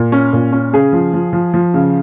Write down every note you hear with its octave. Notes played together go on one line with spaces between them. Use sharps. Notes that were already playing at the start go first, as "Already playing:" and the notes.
Already playing: A#2
C#4
A#2
C#4
C#3 G#4
F3
F3
F3
F3
C#3